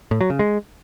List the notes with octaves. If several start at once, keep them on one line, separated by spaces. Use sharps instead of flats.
A2
F#3
C#3
G#3